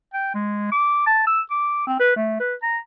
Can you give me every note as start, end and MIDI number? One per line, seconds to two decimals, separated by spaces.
0.14 0.33 79
0.35 0.71 56
0.72 1.06 86
1.07 1.25 81
1.27 1.42 88
1.51 1.83 86
1.87 1.98 60
2.00 2.14 71
2.16 2.36 57
2.40 2.54 71
2.63 2.78 82